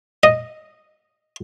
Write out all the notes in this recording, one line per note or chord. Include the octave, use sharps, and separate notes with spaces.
D#5